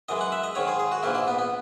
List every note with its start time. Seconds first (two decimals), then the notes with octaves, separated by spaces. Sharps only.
0.09 F#2 E3 G#3 D#5
0.21 F#5
0.32 E5
0.43 D#5
0.55 G#2 D#3 G#3 C#5
0.68 G#4
0.79 G#4
0.92 F#4
1.03 A#1 G#2 E3 A#3 E4
1.15 E4
1.28 B3
1.38 B3